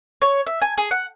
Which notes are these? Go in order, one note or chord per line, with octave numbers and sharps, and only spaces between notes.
C#5
E5
G#5
G#4
F#5